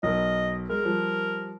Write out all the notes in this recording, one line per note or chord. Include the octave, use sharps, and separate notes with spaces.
B1 A#4 D#5
G#3 A#4
F3 G3